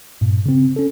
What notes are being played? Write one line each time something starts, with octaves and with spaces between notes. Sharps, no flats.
G2 A#2
C#3 C4
C#4 A4